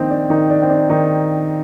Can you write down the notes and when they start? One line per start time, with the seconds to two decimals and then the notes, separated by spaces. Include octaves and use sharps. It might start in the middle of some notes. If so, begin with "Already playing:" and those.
Already playing: A#1 A#2 D#3 C4 D#4
0.10 D4
0.30 D#3 D#4
0.50 D4
0.62 C4
0.69 D4
0.89 D#3 D#4